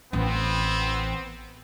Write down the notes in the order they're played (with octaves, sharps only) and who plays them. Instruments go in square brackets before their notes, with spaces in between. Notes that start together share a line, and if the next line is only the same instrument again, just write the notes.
[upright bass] A1 E3 [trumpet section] B3 C4